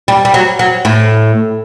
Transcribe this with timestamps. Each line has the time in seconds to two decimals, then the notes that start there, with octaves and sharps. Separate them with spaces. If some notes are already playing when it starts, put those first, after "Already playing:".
0.08 G3
0.25 G3
0.34 F#3
0.59 F#3
0.85 A2